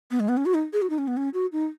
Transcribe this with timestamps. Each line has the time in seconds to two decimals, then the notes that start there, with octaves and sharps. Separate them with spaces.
0.11 B3
0.20 G#3
0.29 B3
0.37 C#4
0.46 F#4
0.54 D#4
0.73 G#4
0.82 F#4
0.90 D#4
0.98 C#4
1.08 B3
1.17 C#4
1.34 F#4
1.52 D#4